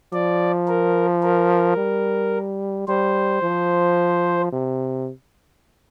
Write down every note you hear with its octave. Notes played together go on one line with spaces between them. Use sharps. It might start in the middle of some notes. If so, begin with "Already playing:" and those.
F3 D5
A#4
A#4
G3
G3 C5
F3
C3